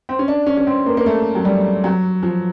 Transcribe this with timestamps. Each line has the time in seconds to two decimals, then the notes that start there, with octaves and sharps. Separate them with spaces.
0.09 C4
0.19 C#4
0.28 D4
0.47 C#4
0.57 C#4
0.67 C4
0.86 A#3
0.97 A#3
1.06 A3
1.35 F#3
1.45 G3
1.84 F#3
2.23 F3